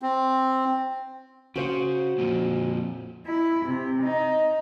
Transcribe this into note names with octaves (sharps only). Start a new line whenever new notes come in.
C4
C#3 F#4 C5 F#5
F2 A#2
E4
C3
D#4